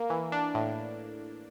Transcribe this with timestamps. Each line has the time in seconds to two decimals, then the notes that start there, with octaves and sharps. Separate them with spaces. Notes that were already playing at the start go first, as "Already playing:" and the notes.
Already playing: A#3
0.10 E3
0.32 D4
0.55 A2